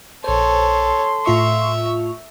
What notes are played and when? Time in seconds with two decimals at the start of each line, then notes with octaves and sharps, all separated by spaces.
0.24 A#1 A4 C5 C#5 C6
1.26 A2 F4 E5 C#6